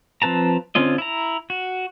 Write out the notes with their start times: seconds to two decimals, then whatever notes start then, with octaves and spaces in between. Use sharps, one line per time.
0.22 F3 C4 B4 A5 A#5
0.75 D3 C4 C#4 F4 D#5
0.98 E4 A#5
1.50 F#4